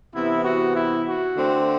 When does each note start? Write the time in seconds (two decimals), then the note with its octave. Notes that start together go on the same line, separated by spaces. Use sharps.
0.15 C3 E3 B3 E4
0.45 F#4
0.76 E4
1.07 F#4
1.37 D3 A3 C4